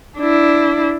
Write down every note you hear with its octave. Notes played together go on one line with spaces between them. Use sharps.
D4 E4